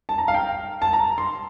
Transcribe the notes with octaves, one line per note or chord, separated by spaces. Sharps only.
A5
A#5
F5
G5
A5
A#5
C6